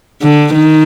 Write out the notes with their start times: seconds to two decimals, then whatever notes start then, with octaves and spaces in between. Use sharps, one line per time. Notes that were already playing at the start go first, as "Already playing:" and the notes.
0.22 D3
0.54 D#3